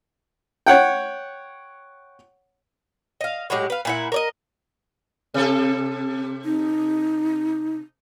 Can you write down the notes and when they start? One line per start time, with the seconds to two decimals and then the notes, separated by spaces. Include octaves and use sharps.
0.66 C#5 F#5 G5
3.21 D#5 F5
3.50 A2 F#3 G#3 G4
3.70 B4 F5
3.85 A#2 E4 F#5
4.12 A#4 D5 D#5
5.34 C3 A4
6.45 D#4